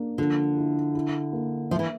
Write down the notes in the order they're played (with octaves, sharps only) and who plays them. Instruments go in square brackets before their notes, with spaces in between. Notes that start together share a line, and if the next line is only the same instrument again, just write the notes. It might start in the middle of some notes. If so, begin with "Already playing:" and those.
Already playing: [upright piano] A#3 D4
[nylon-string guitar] D3 [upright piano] F3
[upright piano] E4
E4
A#3
[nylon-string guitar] F3 [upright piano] E5
[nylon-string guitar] E3